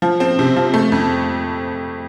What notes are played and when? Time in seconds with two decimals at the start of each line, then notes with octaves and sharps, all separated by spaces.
0.02 F3
0.20 C4
0.39 C3
0.56 F3
0.74 A3
0.92 F2